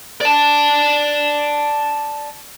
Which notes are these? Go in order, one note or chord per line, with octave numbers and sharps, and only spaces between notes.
D5 A5